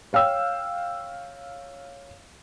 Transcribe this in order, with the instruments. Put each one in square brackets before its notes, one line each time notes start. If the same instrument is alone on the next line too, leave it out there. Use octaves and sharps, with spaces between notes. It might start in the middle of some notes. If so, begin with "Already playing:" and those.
[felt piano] C#5 F5 G5 E6